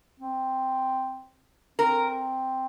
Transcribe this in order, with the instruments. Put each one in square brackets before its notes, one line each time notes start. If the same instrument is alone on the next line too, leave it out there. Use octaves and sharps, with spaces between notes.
[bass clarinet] C4
[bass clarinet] C4 [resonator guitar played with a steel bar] A#4